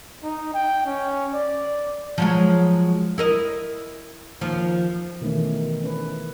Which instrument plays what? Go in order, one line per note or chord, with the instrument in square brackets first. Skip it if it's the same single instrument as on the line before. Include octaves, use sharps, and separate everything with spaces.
[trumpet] D#4
G5
C#4
D5
[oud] F3 F#3 G#3
E4 A#4 D#5
D#2 F3
[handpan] B2 D#3 E3 A3 C#4
C#4 B4